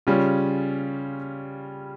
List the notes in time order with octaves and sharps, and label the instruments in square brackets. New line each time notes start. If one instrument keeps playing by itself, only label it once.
[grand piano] C#3 G3 C#4 F4